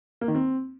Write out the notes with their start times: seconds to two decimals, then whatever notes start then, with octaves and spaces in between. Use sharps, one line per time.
0.21 A#3
0.28 D#3
0.35 C4